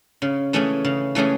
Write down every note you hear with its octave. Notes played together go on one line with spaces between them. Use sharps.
C#3
E3 A3 C#4 G#4
C#3
E3 A3 C#4 G#4